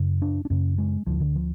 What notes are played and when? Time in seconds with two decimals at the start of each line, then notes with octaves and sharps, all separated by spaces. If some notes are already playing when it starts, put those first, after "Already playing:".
Already playing: F#2 C#3
0.22 D4
0.45 D4
0.50 F#2 C#3 C#4
0.78 G#3
1.07 D2 D3 F3
1.20 D3
1.35 F3